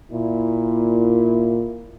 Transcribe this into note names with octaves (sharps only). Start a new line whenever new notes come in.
A#2 E4